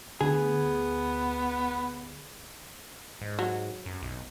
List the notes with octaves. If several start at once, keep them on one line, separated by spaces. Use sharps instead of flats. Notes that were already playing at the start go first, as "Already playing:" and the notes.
D2 B3 G#4
G#2
F#3
F#2
B1